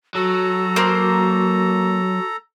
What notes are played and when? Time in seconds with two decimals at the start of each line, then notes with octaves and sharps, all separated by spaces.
0.15 F#3 F#4 A4 A#5
0.76 A#3 C5